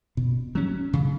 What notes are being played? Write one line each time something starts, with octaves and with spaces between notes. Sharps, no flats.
B2
F#3 C#4
C#3